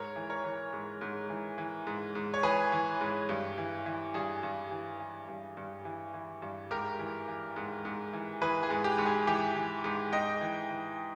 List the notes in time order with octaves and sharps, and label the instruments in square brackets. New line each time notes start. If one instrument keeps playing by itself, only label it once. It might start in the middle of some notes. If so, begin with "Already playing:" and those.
Already playing: [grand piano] G#2 A#4 C#5
E3
A#4 C#5
E3
G#2
G#2
E3
E3
G#2
G#2
C#5
E3 G#4 B4
E3
G#2
G2
E3
E3
G2 G#4
G2
E3
E3
G2
G2
E3
E3
G2
G#2 G4 A#4
E3
E3
G#2
G#2
E3
E3 G#4 B4
G#4
G#2
G4
G#2
G#4
E3 G4
E3
G#2
G#2 D#5 G5
E3
E3